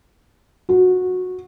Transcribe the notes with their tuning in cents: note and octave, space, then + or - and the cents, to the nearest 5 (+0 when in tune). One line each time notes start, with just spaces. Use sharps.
F#4 -15